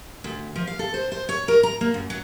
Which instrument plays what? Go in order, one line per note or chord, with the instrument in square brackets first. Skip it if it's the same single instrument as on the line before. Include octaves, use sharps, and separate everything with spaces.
[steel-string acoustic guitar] D2
F3
F5
A4
C5
C5
C#5
A#4
A#5
A#3
F#2
F#3